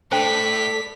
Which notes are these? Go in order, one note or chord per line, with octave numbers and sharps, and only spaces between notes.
A2 A3 A4 C5 D5 G5 B6